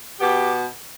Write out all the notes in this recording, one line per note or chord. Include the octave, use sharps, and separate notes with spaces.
B2 B3 G4